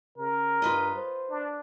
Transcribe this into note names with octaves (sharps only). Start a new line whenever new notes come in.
C#3 A#4
G2 F4 B4 D#5
C5
D4